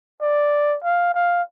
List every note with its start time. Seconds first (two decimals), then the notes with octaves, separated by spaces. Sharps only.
0.22 D5
0.84 F5
1.15 F5